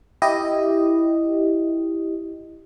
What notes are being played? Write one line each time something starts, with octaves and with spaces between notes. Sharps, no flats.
E4 G4 D#5